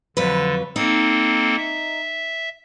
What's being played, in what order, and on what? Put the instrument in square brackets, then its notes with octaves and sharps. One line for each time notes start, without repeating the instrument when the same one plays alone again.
[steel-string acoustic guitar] F2 F#3 B4 [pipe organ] D3
[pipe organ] A#3 C4 A4 [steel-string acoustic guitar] D#4
[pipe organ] E5